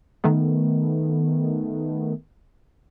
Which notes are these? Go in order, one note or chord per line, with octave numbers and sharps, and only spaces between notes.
D#3 A3 B3